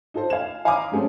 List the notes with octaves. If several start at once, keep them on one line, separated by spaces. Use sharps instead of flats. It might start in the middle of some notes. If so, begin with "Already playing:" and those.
D#4 F4 A4 C5
F5 G#6 E7
F5 G#5 A#5 B5 D6 D#6
F#3 G#3 A3 C4 C#4